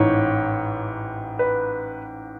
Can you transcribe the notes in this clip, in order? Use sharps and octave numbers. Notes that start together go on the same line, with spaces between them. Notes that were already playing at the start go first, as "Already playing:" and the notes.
Already playing: A1 G#2 E3 C#5
B4